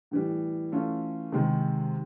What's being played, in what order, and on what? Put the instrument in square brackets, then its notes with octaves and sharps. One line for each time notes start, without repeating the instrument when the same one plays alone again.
[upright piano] A2 E3 G3
E3 A3 C#4 F4
C3 D#3 G#3